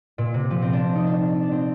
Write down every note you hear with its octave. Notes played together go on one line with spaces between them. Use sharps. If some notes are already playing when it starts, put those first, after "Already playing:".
A#2
C3
F3
C4
D4
D#4
D4
D4
C4